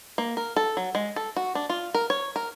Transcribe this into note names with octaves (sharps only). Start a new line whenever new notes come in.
A#3
A#4
A4
F#3
G#3
A4
F#4
D4
F4
A#4
C#5
A#4